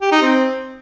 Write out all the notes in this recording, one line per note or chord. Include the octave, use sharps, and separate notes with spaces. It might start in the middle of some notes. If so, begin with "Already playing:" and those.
G4
D#4
C4